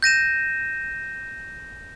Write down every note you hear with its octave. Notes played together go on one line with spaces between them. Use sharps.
G6 A#6 D#7 E7